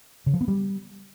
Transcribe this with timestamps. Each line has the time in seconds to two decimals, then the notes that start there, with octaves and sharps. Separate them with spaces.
0.26 C#3
0.34 F3
0.41 B3
0.48 G3